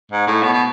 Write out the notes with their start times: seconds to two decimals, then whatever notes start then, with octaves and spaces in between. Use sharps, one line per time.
0.11 G#2
0.27 A2
0.43 B2
0.53 B2